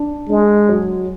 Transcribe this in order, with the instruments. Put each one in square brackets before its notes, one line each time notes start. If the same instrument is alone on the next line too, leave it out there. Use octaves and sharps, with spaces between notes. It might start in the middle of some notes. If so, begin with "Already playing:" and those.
Already playing: [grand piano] D4
[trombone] G#3 [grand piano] D4
[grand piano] F#3